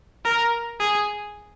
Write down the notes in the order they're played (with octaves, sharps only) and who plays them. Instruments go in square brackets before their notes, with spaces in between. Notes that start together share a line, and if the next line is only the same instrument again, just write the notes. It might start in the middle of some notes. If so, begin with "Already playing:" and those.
[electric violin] A#4
G#4